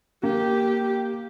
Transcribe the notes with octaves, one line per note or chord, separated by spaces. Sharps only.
A#3 G4